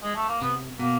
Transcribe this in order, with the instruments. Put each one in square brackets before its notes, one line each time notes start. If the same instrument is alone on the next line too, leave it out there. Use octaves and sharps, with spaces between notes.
[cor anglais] G#3
A3
A#3
[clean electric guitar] C3 [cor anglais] B3
[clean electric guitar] B2 [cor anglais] A#3